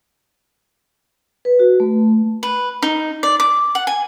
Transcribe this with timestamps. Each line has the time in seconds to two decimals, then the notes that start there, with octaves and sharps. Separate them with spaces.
1.45 B4
1.59 F#4
1.80 A3
2.43 B4
2.82 D#4
3.23 D5
3.40 D6
3.75 F#5
3.87 G#5